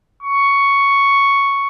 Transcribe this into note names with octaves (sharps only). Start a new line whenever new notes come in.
C#6